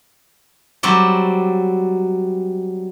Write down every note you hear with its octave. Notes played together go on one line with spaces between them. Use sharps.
F#3 G3 C4 D5